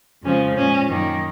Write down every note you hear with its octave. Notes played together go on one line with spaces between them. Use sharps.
F2 C#3 F3 G#3 C#4
A#2 G#3 C#4
F#2 D#3 F#3 A#3